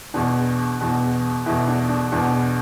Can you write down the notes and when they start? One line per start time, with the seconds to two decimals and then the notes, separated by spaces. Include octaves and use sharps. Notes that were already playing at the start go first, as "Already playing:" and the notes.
0.14 E2 B2 D4
0.81 E2 B2
1.46 E2 B2 E4
1.68 D4
1.89 D4
2.12 E2 B2 D4